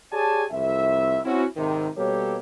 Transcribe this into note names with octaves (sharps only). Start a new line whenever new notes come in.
G4 G#4 C#5 D5 G#5 A5
C2 F2 E5
C4 C#4 E4 F#4
G#1 C3 D#3
B2 G3 A#3 G4 A4 C#5